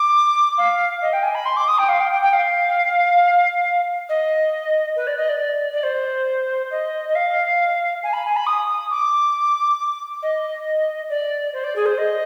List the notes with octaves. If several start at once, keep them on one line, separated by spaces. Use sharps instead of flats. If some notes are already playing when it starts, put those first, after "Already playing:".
Already playing: D6
F5
D#5
G5
G#5
B5
C6
D6
D#6
G5
F5
G5
G5
G5
F5
D#5
B4
D5
D#5
D5
D5
C5
D#5
D#5
F5
G#5
B5
G#5
B5
D#6
D6
D#5
D5
C5
D5
G#4
C5
D#5